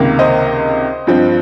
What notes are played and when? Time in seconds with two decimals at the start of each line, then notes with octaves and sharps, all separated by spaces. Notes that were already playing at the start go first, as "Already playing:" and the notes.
Already playing: C#2 C3 D#3 A#3
0.19 C5 D#5
1.07 G2 F3 C4